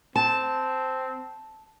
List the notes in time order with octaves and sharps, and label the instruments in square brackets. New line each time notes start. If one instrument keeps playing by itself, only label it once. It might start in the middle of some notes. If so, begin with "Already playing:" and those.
[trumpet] C4 [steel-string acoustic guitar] A5